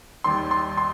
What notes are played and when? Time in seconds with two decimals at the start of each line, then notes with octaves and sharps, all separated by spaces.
0.24 D#2 D#3 G3 C6
0.51 C6
0.77 C6